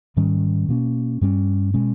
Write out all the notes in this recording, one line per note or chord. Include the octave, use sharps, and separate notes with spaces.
G#2 D#3 G3 C#4
B2 A#3 C#4
G2 G3 C#4
B2 G#3 C#4